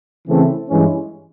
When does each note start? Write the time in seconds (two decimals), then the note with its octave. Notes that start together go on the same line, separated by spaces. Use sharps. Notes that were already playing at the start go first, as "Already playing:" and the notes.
0.27 C#3 E3 A3 C4
0.68 G2 E3 G#3 C#4